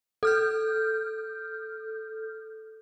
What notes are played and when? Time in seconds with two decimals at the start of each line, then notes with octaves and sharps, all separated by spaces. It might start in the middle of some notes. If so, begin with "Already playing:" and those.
0.23 A4 F6 G6